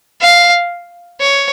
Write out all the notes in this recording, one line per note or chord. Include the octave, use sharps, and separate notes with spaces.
F5
C#5